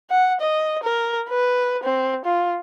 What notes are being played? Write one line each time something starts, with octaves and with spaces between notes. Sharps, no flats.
F#5
D#5
A#4
B4
C4
F4